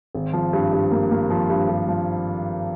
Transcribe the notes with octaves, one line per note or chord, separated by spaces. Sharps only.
G#1
F3
G2
G2
A#3
A#3
F3
G2
G2
F3